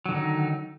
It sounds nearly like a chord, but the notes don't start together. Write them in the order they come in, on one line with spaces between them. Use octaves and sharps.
F#3 D3 D#3 D#4